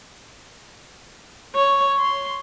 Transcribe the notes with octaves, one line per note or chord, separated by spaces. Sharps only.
C#5
C6